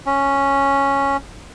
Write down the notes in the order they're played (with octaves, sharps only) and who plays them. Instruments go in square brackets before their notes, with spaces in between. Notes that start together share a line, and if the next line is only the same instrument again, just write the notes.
[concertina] C#4